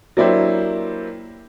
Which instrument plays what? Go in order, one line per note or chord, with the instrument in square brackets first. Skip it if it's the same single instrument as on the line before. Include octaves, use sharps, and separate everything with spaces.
[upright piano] F#3 A#3 D4 E4 G4 C5